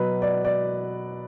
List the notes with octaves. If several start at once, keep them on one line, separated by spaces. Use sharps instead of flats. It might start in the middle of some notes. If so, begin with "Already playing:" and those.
Already playing: B2 F#3 B4
D5
D5